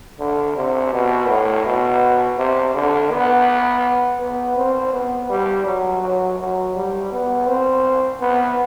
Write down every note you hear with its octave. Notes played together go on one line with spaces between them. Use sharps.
D3
C3
B2
A2
B2
C3
D3
B3
B3
C4
B3
G3
F#3
F#3
F#3
G3
B3
C4
B3